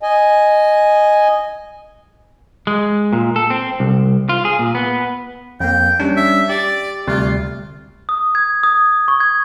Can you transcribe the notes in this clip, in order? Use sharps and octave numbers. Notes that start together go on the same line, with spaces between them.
D#5 G#5
G#3
A#2
A4
C4
C2
F4
G#4
A#2
B3
F2 A#3 G5
G3 C#4 D4
E5
G4 D5
D2 C3 G3 F4
D#6
G#6
D#6
C#6
G#6